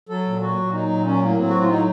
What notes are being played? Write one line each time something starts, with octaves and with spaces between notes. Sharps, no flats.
F#3 A4
A#2
F#3 F#4
A#2
F#3 D#4
A#2
F#3 C#4
A2 A#3
F#3 C4
A2 F#4
F4
F#3 D#4